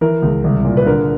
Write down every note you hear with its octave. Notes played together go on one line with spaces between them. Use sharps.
E3 A#4
C#2
C2
A#2
B4
D3 A#4